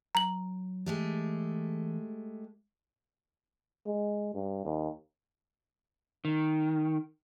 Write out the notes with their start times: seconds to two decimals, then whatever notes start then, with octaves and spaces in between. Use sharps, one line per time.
0.15 F#3 A#5 F#7
0.86 E3 G#3 A3 G4
3.86 G#3
4.34 G2
4.65 D#2
6.25 D#3